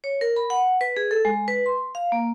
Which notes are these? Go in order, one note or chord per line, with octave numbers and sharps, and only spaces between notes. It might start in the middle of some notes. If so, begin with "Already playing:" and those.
C#5
A#4
B5
F#5
B4
G#4
A4
G#3
B4
C6
F5
A#3